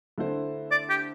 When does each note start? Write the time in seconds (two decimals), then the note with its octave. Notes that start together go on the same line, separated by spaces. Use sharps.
0.18 D3 A3 E4 A4 C5
0.71 D5
0.90 G4